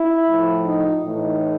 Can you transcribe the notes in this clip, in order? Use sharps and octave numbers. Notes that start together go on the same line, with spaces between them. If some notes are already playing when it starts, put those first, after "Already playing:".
Already playing: E4
A2 F3
D#4
A2 E3 D#4